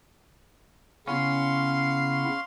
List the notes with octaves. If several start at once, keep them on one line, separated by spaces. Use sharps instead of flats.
C#3 B3 C#4 E4 F5 C6